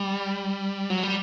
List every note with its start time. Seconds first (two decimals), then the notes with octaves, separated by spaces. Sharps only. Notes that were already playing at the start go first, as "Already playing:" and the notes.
Already playing: G3
0.90 F#3
1.03 G3